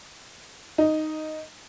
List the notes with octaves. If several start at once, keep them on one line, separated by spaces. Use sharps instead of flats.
D#4